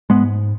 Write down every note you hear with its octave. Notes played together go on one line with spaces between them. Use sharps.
G#2 G#3 B3